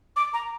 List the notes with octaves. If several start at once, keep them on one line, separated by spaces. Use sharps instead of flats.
D6
A#5